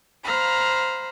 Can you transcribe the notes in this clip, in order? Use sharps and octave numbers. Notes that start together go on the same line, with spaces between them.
C5 F5 A#5 B5